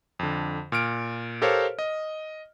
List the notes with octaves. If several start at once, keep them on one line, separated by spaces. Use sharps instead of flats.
F2 D3
A#2 F6 D7
G4 A4 A#4 C5 C#5 F5
D#5